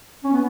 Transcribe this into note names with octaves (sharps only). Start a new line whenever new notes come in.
C#4
B3